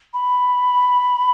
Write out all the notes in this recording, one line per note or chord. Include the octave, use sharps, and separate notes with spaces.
B5